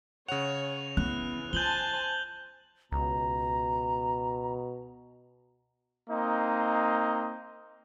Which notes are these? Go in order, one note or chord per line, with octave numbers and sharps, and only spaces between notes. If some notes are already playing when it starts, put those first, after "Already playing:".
C#3 C#5 F#5 F7
E3 B3 F#6
F4 C5 G#5 A5 G6 F#7 G7
C#2 B2 A#5
A#3 C4 D#4 D#5